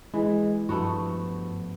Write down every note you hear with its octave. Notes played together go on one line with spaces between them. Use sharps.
E3 G#3
G2 F3 A3 B3 F#4